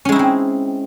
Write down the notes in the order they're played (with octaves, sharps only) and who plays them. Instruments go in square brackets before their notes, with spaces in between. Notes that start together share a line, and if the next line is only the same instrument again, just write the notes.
[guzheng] C#4
G#3
E4
D#4
C4